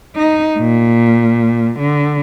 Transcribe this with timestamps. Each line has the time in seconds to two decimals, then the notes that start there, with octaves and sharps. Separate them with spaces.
0.16 D#4
0.58 A#2
1.79 D3